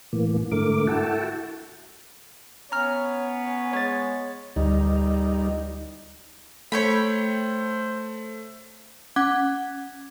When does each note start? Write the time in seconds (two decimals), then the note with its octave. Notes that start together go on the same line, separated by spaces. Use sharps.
0.13 A2 E3 A#3
0.52 G#2 D3 A3 A#4 D6
0.87 E4 F#4 A4 F#5 G5 A5
2.72 B3 C#4 C#5 A#5 F6
3.73 G#3 C#5 A6
4.56 D2 G3 D#4
6.72 A3 C5 C#5 G5 B5
9.16 C#4 F#5 D6 F#6 G#6